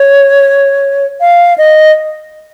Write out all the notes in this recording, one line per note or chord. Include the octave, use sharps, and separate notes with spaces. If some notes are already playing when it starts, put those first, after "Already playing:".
Already playing: C#5
F5
D#5